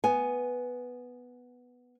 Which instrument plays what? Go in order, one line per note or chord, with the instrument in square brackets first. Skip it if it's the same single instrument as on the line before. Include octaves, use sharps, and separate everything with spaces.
[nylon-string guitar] B3 G#5